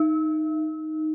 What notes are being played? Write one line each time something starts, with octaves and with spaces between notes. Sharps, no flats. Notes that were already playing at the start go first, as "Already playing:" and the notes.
Already playing: D#4